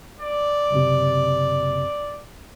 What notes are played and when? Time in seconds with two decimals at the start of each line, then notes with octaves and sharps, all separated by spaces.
0.21 D5
0.70 F#1 C3